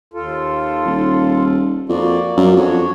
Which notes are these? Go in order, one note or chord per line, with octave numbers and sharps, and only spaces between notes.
D#2 F4 A4
D#1
F2 A#3 F#4 D5
F#2
F2 D4 F#4 C#5